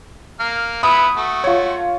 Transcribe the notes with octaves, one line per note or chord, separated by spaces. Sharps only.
A#3 F6
B3 E4 B5 D#6
A3 F#4
F4 C#5